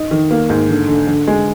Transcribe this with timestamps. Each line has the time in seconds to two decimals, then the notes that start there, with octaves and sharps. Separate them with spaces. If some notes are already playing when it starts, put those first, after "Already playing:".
Already playing: D#4
0.11 D#3
0.31 A#3
0.50 G#2
0.69 D3
0.88 D3
1.07 D3
1.27 G#3